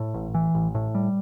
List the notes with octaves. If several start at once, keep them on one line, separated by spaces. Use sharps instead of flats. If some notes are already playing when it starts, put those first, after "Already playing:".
Already playing: A2
A1
E3
A1
A2
G3